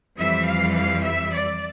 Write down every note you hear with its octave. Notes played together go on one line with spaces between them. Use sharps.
F2 E3 G3 E5
F5
F5
E5
D5